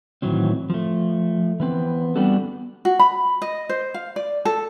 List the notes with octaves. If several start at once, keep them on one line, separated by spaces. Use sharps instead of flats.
A2 D#3 E3 F#3 C4
F3 A3
E3 B3 C4
G3 B3 D4 F#4 G4 A4
F#4
B5
D#5
C5
F5
D5
A4